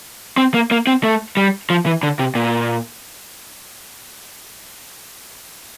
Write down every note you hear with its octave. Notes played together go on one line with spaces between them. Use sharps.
C4
A#3
A#3
C4
A3
G3
F3
E3
D3
C3
A#2